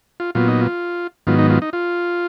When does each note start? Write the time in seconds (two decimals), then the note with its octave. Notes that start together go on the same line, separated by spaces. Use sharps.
0.20 F4
0.35 A#2 F#3 B3 F4
0.48 D#4
0.61 F4
1.27 G#2 D#3 F#3 B3 F4
1.39 D#4
1.50 F4
1.62 D#4
1.73 F4